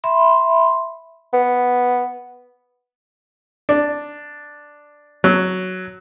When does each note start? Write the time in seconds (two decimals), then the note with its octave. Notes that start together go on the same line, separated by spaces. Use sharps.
0.04 E5 B5 C6
1.33 B3
3.69 D4
5.24 F#3